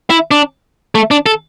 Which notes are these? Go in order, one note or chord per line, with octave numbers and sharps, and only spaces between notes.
E4
D4
A3
D4
A4